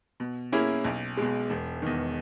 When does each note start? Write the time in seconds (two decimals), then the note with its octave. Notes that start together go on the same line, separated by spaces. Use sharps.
0.20 B2
0.52 A#3 C#4 E4 G#4
0.84 B1
1.17 B2 G#3
1.50 E1
1.82 E2 D#3